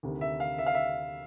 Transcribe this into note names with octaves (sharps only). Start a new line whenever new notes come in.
D2 C3 D#3
E5
F5
E5
F5
E5